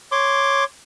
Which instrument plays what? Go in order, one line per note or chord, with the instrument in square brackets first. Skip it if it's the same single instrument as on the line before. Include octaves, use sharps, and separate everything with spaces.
[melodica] C#5 C6 D6